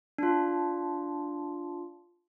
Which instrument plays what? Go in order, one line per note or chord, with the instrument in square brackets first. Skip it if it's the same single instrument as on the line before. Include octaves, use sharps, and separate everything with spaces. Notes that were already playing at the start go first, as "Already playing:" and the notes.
[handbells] D4 F4